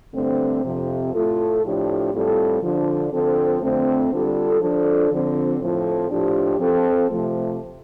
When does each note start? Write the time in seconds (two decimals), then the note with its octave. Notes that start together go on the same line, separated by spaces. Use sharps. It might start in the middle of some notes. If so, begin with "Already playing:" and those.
0.15 G2 D3 A3 C4
0.64 F2 C3 F3
1.14 A2 A3 F4 A4
1.63 A2 F3 D4 G4
2.13 A2 G3 C4 F4 A4
2.63 D3 F3 D4
3.12 D3 F3 C4 A4
3.62 F2 D3 A3 C4
4.11 D3 G3 F4 A4
4.61 F3 D4 A4
5.11 D3 F3 C4
5.60 A2 F3 C4 A4
6.10 A2 F3 D4 G4
6.60 F3 C4 A4
7.10 C3 F3 A3